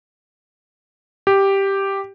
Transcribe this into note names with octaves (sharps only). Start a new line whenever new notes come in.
G4